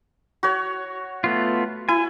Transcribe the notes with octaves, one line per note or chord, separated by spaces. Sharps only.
F#4 C#5
A3 B3 F4
E4 G#5